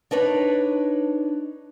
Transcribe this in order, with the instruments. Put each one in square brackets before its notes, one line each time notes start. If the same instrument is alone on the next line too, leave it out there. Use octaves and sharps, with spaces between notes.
[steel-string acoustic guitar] D4 D#4 B4 C#5